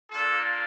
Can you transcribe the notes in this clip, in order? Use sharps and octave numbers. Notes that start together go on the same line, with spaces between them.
A#3 D4 F4 A4